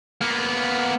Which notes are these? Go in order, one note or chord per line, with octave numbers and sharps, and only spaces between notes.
A#3 B3